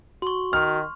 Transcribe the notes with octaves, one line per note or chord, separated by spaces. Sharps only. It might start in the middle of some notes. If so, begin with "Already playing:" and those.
F#4 C6 C#6
D#3 F6